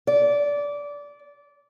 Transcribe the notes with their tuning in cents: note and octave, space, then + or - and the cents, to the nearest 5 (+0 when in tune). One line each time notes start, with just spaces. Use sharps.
D5 -20